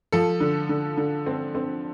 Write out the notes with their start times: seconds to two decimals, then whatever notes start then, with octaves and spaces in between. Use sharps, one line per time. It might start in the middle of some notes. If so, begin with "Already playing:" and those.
0.12 F3 A4
0.40 D3
0.69 D3
0.97 D3
1.26 C4
1.55 C4